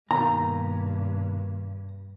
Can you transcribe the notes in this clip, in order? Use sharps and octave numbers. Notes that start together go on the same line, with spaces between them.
G2 B2 D#3 A#3 A#5